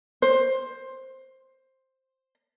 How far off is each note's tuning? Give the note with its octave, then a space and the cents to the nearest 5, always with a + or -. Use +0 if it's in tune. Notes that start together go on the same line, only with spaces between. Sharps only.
C5 +10